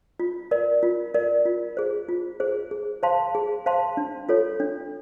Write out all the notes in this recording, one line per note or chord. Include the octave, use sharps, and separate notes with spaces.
F4
A#4 D5
F4
A#4 D5
F4
G#4 C5
F4
G#4 C5
G#4
C5 F5 A5 C6
G#4
C5 F5 A5 C6
D4
F4 A4 C#5
D4